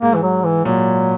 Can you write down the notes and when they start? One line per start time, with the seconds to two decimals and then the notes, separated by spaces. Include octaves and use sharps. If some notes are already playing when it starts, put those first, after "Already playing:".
0.02 G#2 A#3
0.15 E3
0.22 F#3
0.44 E3
0.65 A#2 F#3